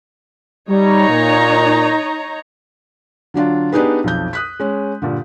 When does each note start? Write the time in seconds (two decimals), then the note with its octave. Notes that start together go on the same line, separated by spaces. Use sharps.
0.69 G3 D#4 C#5 A#5
1.08 A#2
3.34 D3 F#3 D4 F4
3.72 B3 D4 D#4 G4 G#4 B4
4.04 B1 F2 G6
4.33 D#6 F#6 B6
4.60 G#3 C#4
5.02 G2 A#2 D3